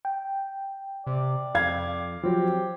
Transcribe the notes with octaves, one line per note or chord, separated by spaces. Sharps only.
G5
C3 D5
F2 F5 G#6
F3 F#3 C4 G4